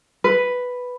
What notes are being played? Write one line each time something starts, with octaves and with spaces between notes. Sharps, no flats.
B4